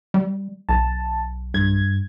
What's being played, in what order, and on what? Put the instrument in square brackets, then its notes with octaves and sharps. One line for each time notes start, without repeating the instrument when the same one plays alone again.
[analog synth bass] G3
[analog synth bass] B1 [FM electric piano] A5
[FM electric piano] G2 G#6